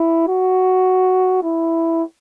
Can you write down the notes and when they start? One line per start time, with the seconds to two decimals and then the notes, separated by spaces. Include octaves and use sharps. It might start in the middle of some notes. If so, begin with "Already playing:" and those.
Already playing: E4
0.27 F#4
1.43 E4